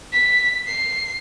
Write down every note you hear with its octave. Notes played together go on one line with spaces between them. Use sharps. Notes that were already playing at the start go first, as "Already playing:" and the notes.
B6
C7